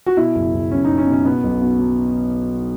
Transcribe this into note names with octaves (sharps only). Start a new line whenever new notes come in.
F#4
B2 E4
F#1
F#1
F#1 C#4
F#1 D#4
C#4
B2
C#4
B2 B3
B1
B2
F#3